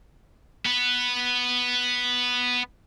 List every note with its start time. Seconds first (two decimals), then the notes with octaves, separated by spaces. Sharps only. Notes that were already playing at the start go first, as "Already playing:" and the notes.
0.66 B3 B4